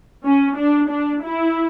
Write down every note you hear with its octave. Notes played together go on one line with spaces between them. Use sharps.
C#4
D4
D4
E4